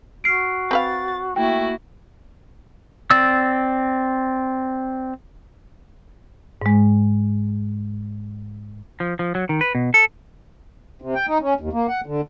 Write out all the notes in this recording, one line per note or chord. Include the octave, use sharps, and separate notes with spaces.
F#4 F6 C7 D7
C4 B4 F5 A6
A3 A#3 E4 F#4 G5
C4 D5 E6
G#2 G#3
F3
F3
F#3
D#3
B4
B2
A4
C3
G5
D#4
C#4
D#2
A#3
F#5
D3